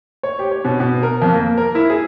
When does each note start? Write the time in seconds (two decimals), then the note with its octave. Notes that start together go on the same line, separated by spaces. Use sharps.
0.23 C#5
0.39 G4
0.51 C#5
0.65 B2
0.80 B2
1.03 A#4
1.22 F2
1.33 A#3
1.58 A#4
1.75 E4
1.90 G#4